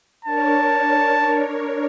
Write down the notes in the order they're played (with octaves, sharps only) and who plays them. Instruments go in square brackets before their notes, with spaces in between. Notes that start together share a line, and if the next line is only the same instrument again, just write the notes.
[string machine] D4 A#4 C#5 [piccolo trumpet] A5